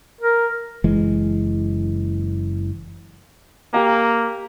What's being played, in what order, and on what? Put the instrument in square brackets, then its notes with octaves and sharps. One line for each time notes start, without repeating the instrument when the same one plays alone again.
[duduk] A#4
[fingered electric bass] F#1 E3 G#3
[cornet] A#3 [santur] G4 A#5